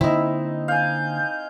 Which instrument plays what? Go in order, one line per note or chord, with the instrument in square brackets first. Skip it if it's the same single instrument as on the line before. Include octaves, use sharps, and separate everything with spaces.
[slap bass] D3 A#3 [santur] C4 D#4 [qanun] E4
[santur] F5 G#5 [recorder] G6